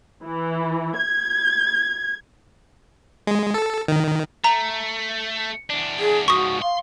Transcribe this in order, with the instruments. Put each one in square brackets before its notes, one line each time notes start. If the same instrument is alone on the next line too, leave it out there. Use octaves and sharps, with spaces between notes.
[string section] E3
G#6
[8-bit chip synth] G#3
A4
D#3
[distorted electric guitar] A3 [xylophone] A#5
[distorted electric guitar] E2 D4
[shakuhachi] G#4
[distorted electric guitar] G#2 F3 [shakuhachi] F#4 [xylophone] C#6 D#6
[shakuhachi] F5 [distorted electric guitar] C6